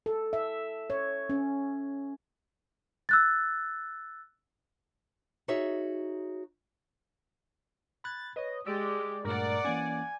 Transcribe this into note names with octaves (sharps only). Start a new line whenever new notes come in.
A4
E5
C#5
C#4
E6 F#6 A6
D#4 F#4 G#4 C#5 E5
B5 F#6 G#6 A6
B4 C#5 D#5
G#3 G4 D5 E6
G2 A#2 A3 A#4 D5 F#5
E3 A#3 C#4 G#5